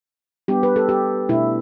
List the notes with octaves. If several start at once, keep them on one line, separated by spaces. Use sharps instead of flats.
G3 B3 D4 G4
B4
A4
G4
B2 A3 D4 E4